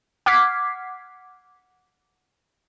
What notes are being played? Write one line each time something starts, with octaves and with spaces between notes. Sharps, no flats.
F#5 D6 F6 G#6 B6 C7